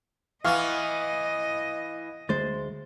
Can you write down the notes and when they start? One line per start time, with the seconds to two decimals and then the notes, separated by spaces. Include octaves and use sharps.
0.44 E3 B3 D#5 F5 C#6 F6
2.29 D2 G#3 C5 A6